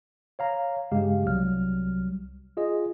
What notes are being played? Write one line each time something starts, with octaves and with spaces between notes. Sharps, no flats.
C#5 F5 A#5
G2 C#3 G#3 G4 F5
C2 F#3 G3 F6
F4 G#4 D#5